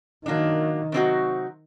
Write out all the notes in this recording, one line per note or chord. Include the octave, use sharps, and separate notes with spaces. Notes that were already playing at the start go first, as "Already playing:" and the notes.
D#3 F#3 A#3 D4
C3 F#3 C4 D#4 F#4